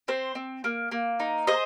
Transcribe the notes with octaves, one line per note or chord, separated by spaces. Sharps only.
C4 C5
C4
A#3
A#3
D#4
G#4 C5 D#5